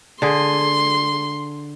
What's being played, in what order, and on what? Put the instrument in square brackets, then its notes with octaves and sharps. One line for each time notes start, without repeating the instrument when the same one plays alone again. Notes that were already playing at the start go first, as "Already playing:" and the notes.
[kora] D3 G#4 [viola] C6